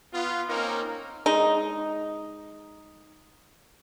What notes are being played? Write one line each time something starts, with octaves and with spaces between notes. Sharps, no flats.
B3 F4
A#3 C4 C#4 D#4 A#4
G#3 D#4